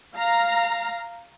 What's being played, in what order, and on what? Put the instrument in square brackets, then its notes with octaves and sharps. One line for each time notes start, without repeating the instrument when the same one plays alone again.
[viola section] F5 A#5